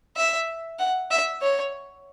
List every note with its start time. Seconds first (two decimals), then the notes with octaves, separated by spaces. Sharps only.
0.17 E5
0.79 F#5
1.11 E5
1.42 C#5